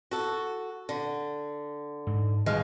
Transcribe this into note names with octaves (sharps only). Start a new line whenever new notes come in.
F#4 A4
D3
G#2
B2 D#3 G3 G#3 F5